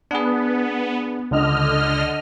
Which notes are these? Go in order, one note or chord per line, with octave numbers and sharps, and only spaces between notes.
B3 D4 G#4
C#2 D3 D#5 F6